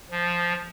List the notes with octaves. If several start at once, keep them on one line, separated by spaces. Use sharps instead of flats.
F3